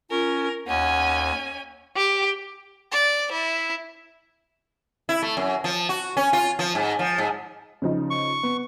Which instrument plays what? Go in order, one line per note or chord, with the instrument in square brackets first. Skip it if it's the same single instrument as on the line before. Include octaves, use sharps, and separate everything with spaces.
[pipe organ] C#4 [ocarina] F4 [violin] A#4
[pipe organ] D#2 [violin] C#4 G#5 [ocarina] F#5
[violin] G4
[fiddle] D5
E4
[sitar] E4
A3
F#2
F3
F#4
C#4
F4
F3
G#2
F3
G#2
[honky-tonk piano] C#3 F3 D#4
[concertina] C#6
[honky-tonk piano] B3